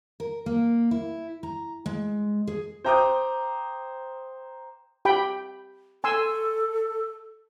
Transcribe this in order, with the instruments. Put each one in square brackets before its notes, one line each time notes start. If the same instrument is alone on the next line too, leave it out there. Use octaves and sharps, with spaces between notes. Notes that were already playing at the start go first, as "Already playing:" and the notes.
[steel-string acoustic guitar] A#4
A#3
E4
A#5
G#3
G#4
[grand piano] C5 G5 A#5 D6 D#6 G6
[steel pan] G4 G5 B5
[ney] A4 [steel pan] G#5 C6 E6